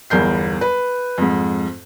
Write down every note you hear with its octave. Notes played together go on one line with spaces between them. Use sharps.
G1 E2 A#4 G6 C7
B4
F2 G#2